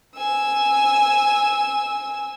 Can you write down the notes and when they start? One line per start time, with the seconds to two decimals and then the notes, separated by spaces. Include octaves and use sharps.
0.17 G#5 E6